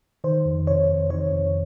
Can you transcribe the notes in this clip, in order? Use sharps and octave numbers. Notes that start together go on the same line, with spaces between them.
D#3 C5
F2
C3 C#5
F2
D#3 C#5
F2